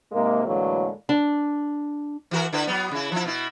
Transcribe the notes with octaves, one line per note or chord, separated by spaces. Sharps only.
G#2 C3 G#3 A#3
A2 D3 E3 F#3 G#3 A#3
D4
E3 F#4 A#4
D3 E4 B4
F#3 B3
C#3 E4
F3 E4
B2 E4